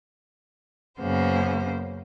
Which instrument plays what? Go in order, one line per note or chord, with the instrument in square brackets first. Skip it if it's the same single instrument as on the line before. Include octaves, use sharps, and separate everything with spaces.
[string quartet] F#2 C#3 A#3 B3 C5